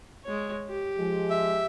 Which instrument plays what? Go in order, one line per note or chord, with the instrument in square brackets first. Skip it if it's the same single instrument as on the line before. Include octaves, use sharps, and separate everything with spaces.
[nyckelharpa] G#3 C#5
G4
[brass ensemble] F3 G#3
[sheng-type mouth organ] E5